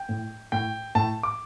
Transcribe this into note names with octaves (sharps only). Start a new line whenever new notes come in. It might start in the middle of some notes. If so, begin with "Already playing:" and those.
Already playing: G5
A2
A2 G5
A2 A5
D6